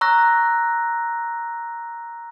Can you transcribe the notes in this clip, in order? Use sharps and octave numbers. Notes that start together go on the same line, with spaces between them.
A#5 C#6 E6 F#6 A#6